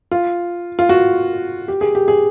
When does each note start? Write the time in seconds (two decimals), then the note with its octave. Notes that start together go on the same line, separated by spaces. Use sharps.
0.11 F4
0.79 F4
0.89 F#4
1.68 G4
1.81 G#4
1.95 G4
2.08 G#4